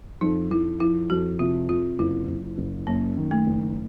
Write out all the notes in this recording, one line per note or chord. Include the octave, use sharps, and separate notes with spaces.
F2 D#4
F2 E4
F3 E4
F2 F#4
C3 F4
C3 F4
F#1 E4
F#1
F#1
F#2 A#3
D#3
A3
F#1